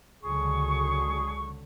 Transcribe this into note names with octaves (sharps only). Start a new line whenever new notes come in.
C#2 D3 F#3 G#4 C#6